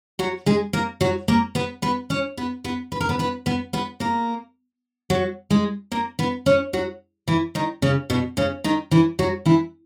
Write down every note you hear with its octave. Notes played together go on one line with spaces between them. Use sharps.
F#3 F#4
G#3 G#4
A#3 A#4
F#3 F#4
A#3 A#4
B3 B4
B3 B4
C#4 C#5
B3 B4
B3 B4
B4
A#4
B3 B4
B3 B4
B3 B4
B3 B4
A#3 A#4
F#3 F#4
G#3 G#4
A#3 A#4
B3 B4
C#4 C#5
F#3 F#4
E3 E4
D#3 D#4
C#3 C#4
B2 B3
C#3 C#4
D#3 D#4
E3 E4
F#3 F#4
E3 E4